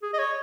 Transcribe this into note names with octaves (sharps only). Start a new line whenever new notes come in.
G#4
D#5
C#5